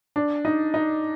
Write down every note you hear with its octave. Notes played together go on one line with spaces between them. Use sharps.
D4
D#4
D#4